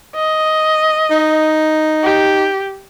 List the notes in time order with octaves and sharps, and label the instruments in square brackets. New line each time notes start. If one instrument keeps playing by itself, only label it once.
[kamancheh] D#5
[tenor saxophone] D#4
[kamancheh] G4